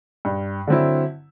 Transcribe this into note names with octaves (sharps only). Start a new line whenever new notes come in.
G2
D3 F#3 C4 E4